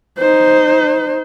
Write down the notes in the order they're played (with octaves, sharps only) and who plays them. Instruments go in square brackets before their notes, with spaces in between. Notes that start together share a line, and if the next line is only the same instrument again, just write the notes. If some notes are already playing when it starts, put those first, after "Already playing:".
[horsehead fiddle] D#4 C5